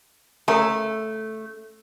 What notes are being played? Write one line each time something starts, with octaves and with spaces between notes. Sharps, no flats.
C#3 A3 A#4